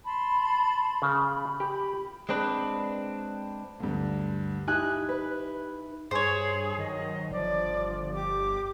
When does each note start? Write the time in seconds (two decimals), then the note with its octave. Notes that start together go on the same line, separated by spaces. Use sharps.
0.04 A5 B5 C6
1.02 C#3
1.25 B5
1.60 G4
2.29 G#3 C4 D4 B4
3.80 D2 G2
4.68 D#4 E4 G4 G#5 F#6
5.09 B4
6.11 G2 G#4 C5 C#5
6.78 D#3 F#3 D#5
7.31 G1 F3 D5
8.14 G4 D6